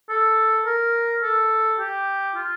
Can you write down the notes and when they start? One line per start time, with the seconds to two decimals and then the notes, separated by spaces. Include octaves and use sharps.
0.09 A4
0.66 A#4
1.22 A4
1.79 G4
2.35 F4